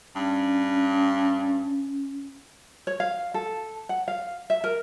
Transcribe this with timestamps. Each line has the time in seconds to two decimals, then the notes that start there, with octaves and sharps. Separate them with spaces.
0.15 G2 C#4
2.87 C#5
3.00 F5
3.34 A4
3.89 F#5
4.08 F5
4.50 E5
4.64 A#4